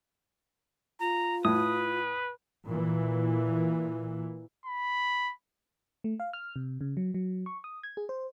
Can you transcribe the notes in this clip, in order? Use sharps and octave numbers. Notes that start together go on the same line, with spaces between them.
F4 A#5
A2 B4 D#6
A#2 E3
B5
A3
F5
F6
C3
C#3
F#3
F#3
C#6
D#6
G#6
G#4
C5